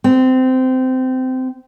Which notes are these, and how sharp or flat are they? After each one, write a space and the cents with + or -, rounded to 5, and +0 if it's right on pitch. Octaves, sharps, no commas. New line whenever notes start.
C4 -20